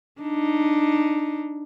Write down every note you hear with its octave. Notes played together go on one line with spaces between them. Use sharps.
D4 D#4